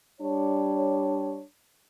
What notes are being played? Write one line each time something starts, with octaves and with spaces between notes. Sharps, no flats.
G3 D4 C#5